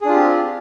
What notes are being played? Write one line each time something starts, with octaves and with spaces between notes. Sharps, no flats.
C4 D4 F4 G4 G#4